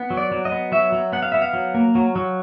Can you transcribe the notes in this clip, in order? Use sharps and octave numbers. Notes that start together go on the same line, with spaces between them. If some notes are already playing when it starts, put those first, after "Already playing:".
Already playing: B3
F#3
D5
F#3
D#5
B3
F#3 E5
F#3
B3 F#5
F5
B3 E5
F5
F#3
A#3
F#3
F#3